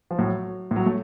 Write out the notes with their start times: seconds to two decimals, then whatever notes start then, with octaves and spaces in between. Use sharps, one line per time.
0.11 F3
0.19 A2 F#3
0.71 A2
0.76 F#3
0.86 A3